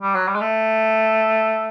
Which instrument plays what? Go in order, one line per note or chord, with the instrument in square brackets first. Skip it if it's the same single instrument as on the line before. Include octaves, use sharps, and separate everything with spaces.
[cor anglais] G3
F#3
G3
G#3
A3